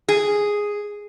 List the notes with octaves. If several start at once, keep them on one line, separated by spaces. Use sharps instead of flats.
G#4